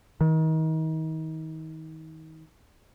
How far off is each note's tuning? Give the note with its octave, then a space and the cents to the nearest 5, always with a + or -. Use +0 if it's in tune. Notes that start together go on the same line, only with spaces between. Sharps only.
D#3 +35